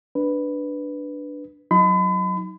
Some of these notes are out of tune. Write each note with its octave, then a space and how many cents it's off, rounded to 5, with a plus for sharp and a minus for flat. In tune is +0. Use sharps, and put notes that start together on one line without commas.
D4 +0 B4 +0
F#3 -5 D#4 +15 B5 +40